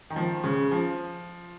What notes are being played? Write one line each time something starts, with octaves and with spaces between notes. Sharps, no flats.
D#3
F3
C#3
F3